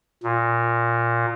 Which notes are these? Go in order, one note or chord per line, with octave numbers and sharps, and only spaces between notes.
A#2